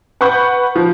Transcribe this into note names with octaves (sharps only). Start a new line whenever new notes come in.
B4 F#5 B5 C#6 G6
F3